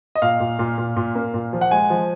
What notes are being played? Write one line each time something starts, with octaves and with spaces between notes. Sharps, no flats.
D#5
A#2 F5
A#2
A#2
A#2
A#2
A#3
A#2
F3
F#5
G#3 G#5
F3